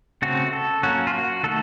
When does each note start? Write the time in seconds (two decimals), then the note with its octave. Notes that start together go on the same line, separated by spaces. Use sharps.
0.22 C#3 A3 C4 F#4
0.53 A4
0.83 F#3 A#3 C#4 F#4
1.07 F4
1.14 F#4
1.43 D#3 A3 A4